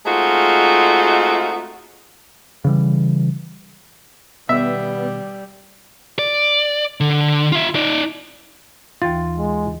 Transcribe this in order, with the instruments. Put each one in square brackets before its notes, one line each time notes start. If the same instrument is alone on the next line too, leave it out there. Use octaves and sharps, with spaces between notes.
[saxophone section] G#3 A3 C4 D#4 F4 F#4
[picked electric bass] C#3 E3 G3
[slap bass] B2 D#3 [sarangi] G3 [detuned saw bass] B3 [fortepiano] E5
[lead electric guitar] D5
D3
F4 E5
D#4 D5
[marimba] D#2 E3 A6 [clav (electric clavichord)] F4
[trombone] G#3